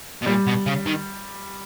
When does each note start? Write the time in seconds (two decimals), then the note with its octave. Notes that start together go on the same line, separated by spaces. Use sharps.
0.22 B2
0.26 A#2 G3
0.47 B2
0.66 C#3
0.86 D#3